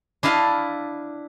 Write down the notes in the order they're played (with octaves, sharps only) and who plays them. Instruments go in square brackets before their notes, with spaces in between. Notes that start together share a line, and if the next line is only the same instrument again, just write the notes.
[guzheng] D4 E4 D#5 F5 A5